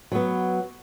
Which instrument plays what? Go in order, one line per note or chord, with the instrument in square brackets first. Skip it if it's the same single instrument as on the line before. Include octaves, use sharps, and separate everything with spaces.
[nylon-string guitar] F#3 B3